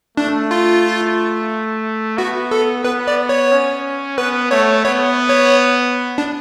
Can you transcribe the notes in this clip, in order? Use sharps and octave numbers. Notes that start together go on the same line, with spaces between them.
A3 D4
F4
B3 F#4
A4
B3 B4
D5
C#5
C#4
B3 B4
A3 C#5
B3 C#5
C#5
D4